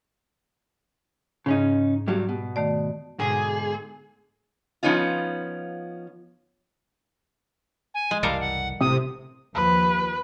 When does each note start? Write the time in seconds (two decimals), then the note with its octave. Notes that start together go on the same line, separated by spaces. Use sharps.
1.46 G#2 C#3 C#4 D#4
2.07 G2 F#3 G3
2.29 B2
2.56 D#3 A3 D5
3.20 G#2 B2 D3 G#4
4.83 F3 B3 C#4 D#4 F4
7.94 G#5
8.11 G#3
8.23 F#1 C2 E3 G3 A4 A#4 F5
8.40 F#5
8.81 A1 A2 C3 D#6
9.55 D#2 F3 B4